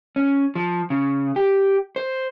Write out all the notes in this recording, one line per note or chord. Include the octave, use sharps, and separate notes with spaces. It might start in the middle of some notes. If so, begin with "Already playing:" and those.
C#4
F3
C#3
G4
C5